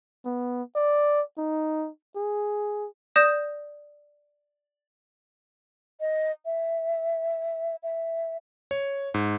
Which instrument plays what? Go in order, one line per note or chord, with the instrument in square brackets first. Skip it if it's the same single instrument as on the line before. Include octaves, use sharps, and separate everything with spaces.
[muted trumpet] B3
D5
D#4
G#4
[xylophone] D5 D#6 G6 A#6 E7
[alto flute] D#5
E5
E5
[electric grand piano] C#5
G#2